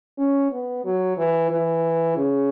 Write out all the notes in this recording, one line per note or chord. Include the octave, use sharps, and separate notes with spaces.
C#4
B3
F#3
E3
E3
C#3